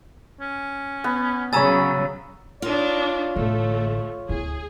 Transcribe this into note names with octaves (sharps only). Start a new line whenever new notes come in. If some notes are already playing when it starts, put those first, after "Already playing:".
C#4
B3
C#3 F#3 C#5 G#5 A#5 B5 E6 A6
D4 D#4 F4 C#5
A1 D3 A3
D2 E4 G#4